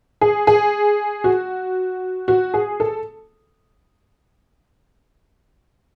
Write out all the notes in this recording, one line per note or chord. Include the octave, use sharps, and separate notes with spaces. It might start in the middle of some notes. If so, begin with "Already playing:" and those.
G#4
G#4
F#4
F#4
G#4
A4